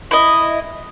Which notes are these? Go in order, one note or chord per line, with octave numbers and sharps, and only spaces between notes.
E4 D#5